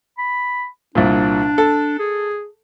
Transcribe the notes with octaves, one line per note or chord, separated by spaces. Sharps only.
B5
C2 A#2 D4
A4
G#4